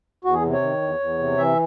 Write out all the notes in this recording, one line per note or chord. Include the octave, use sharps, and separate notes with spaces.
E2 F#4
G#4
C3
C#5
D#3
E2
E2
C3
E3 E5